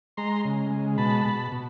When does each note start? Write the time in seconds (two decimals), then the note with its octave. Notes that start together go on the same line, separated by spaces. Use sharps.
0.17 G#3 A#5 C6
0.44 C#3
0.71 G#3
0.98 B2 A5 B5
1.25 B2
1.52 B2